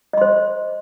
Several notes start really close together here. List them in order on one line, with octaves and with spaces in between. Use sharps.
D#5 C6 C5